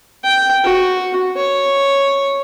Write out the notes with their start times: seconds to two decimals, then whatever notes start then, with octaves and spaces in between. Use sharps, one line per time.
0.24 G5
0.64 F#4
1.36 C#5